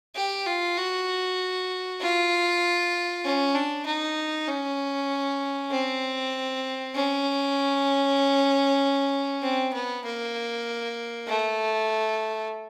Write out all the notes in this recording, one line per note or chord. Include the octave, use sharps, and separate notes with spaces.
G4
F4
F#4
F4
C#4
D4
D#4
C#4
C4
C#4
C4
B3
A#3
A3